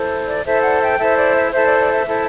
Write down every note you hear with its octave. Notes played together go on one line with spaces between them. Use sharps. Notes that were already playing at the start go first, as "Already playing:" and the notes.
Already playing: E4 A4 C5
D5
E4 A4 C5 E5
D5 F#5
E5 G5
E4 A4 C5 E5
D5
E5
E4 A4 C5 E5
D5
D5
E5
E4 A4 C5